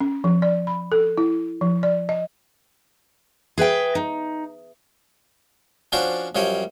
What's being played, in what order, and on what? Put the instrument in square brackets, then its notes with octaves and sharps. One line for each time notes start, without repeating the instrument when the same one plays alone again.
[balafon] C#4
F3
D5
B5
A4
E4
F3
D5
D#5
[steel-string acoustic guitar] G#4 B4 E5 G5
D#4
[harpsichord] F3 C#4 D4 F#4 C5 D5
F#2 F3 G3 C#5 G5